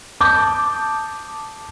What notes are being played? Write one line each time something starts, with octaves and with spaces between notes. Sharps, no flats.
A5 D6 D#6 G6